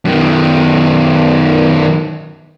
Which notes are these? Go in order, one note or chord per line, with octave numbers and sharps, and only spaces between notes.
F#2 D#3